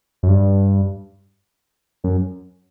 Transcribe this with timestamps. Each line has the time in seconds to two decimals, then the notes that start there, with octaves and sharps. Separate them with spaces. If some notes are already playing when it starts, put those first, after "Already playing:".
0.23 F#2
0.29 G2
2.04 F#2